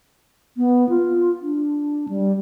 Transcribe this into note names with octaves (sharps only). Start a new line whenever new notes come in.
B3
F4
D4
G3